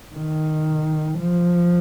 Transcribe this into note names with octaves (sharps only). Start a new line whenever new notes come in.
D#3
F3